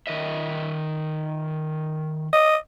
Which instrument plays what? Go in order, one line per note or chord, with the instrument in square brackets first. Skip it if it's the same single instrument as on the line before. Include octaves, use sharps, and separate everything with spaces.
[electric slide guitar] D#3 D#5 E5
[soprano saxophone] D#5